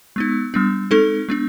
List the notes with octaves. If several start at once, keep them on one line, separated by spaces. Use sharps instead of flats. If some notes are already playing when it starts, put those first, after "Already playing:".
G#3 B3 D#4
G3 B3 D4
G#3 C4 D#4 A4
G#3 B3 D4